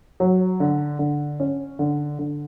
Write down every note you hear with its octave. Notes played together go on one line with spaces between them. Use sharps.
F#3
D3
D3
C#4
D3
D3